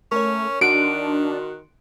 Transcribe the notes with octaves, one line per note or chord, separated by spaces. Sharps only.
A3 C#4 A#4 C#5
D#3 D4 F#4 C6 F#6 D7